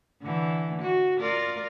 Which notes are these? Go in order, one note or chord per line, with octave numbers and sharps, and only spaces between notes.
D3 E3
F#4
F4 A#4 D5